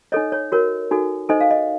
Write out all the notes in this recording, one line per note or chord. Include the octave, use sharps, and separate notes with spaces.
D#4 A4 C#5 D#5
C#5
F#4 A#4 C#5
D#4 F#4 A4
D#4 A4 C5 D#5
F5
D#5